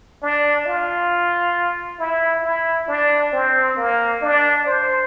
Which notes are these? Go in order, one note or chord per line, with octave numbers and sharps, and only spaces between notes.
D4
F4
E4
E4
D4
C4
A#3
D4
C5